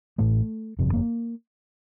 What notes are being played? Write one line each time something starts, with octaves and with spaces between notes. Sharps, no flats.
A1 A2 A3
G1 F2 C3
A#3